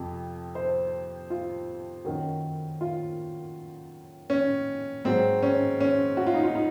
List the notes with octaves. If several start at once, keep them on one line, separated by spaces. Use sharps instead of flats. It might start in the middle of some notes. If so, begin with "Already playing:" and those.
Already playing: F2 C3 F3
C5
F4
F#2 D#3 F#3
F4
C#4
G#2 F#3 C4
C#4
C#4
F#4
F4
D#4
F4
D#4